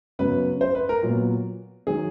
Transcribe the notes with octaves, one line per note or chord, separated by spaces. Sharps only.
F#2 C#3 F#3 B3 B4
C5
B4
A#4
A#2 F#3 B3
D#3 F#3 G#4